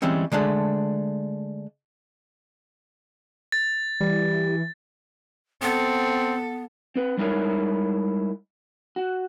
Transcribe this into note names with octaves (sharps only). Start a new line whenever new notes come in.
E3 G3 G#3 C4 C#4
D3 G#3 A3 D4
A6
E3 G3
B3 C4 A4
C4 B4
G3 G#3 D#4 E4 A#4 C#5
F#4